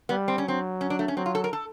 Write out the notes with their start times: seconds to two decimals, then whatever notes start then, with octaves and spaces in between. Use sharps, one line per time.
0.09 G3 B3
0.28 C4
0.38 C#4
0.45 F#3 C4
0.81 C#4
0.90 D4
0.99 A3
1.08 C#4
1.17 F#3 C4
1.26 F4
1.35 A4
1.44 A#4
1.53 A4